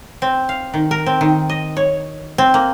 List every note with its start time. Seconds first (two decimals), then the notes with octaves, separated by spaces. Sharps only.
0.22 C4
0.49 F5
0.74 D#3
0.91 A#4
1.06 C4
1.21 D#3
1.49 D#5
1.77 C#5
2.38 C4
2.54 A#3